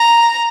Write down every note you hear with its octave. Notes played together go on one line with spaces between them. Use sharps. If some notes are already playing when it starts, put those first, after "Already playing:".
Already playing: A#5